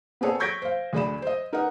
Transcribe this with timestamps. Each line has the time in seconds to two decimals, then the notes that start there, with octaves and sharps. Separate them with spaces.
0.21 B3 C4 G#4 A4 C#5
0.40 C#6 G6 G#6 A#6 B6 D7
0.62 C5 F5
0.93 D2 G#4 D5 B5 E7
1.22 C5 D#5
1.53 D#4 A#4 B4 D#5 F#5